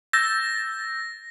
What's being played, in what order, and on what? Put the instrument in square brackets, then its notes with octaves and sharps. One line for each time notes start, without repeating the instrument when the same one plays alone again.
[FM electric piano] E6 G6 A6 [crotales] A#6